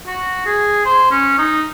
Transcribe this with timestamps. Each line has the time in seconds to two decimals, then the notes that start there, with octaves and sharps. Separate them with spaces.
0.07 F#4
0.46 G#4
0.85 C5
1.11 C#4
1.38 D#4